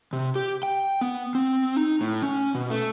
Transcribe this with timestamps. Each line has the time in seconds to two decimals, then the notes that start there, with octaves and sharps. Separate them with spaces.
0.13 C3
0.36 G4
0.63 G5
1.01 B3
1.35 C4
1.76 D#4
2.01 A2
2.23 C#4
2.55 B2
2.70 A3